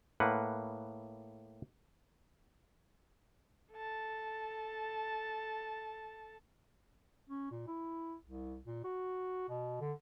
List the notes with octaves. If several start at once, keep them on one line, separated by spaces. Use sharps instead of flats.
A2 A#3 B4 F#5
A4 A5
C#4
A#2
E4
C2
A#2
F#4
B2
D3